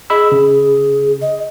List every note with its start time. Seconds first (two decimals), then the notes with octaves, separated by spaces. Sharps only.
0.10 G#4 D#5 B5 E6
0.32 C#3
1.22 D#5